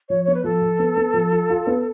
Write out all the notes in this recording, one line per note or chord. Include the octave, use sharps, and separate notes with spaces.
F3 C#5
B3 C#5
B4
F3 A4
F3
B3
B3
F3
F4
F4
B3